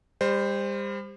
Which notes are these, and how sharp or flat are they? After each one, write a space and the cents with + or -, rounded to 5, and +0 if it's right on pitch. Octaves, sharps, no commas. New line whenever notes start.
G3 +35 C5 +0